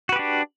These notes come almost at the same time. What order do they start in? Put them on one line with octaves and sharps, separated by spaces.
F#4 B4 G4 D4